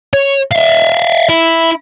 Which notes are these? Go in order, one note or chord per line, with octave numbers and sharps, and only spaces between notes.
C#5
E5 F5
E4